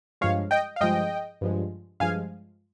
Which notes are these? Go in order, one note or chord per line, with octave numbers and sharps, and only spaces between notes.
G2 F3 G#3 C#5 F5
D#5 G5
F5
G2 F3 G#3 D#5 G5
G2 F3 G#3
G2 F3 G#3 F5 G#5